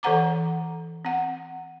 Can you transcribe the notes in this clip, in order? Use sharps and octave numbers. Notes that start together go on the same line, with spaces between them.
E3 A4 C5 F#5 A#5 D6
C4 F#5